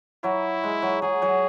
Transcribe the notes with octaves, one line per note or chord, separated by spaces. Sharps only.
F#3 E4
G#3
F#3
F#3 G#4
F#3